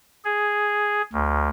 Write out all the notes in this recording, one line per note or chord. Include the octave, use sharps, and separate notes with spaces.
G#4
D2